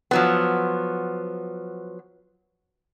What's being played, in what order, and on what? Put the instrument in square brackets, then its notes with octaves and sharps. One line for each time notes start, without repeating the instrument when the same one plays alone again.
[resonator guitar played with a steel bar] F3 F#3 B3